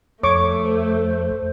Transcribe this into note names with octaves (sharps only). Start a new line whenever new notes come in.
F2 A3 C#5 C#6 D6
C5